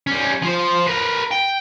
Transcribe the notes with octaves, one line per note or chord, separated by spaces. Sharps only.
G3 C#4
F3 C5
A#4 B4
G5